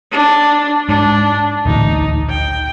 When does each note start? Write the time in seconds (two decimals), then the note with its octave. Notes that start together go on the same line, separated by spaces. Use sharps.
0.11 D4
0.89 G#2 D4
1.66 D#1 A1 D2 D#4
2.30 G5